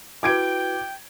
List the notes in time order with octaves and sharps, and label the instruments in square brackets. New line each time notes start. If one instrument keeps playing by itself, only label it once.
[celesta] E4 F#4 B4 [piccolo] G5 [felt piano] D6 G#6 D7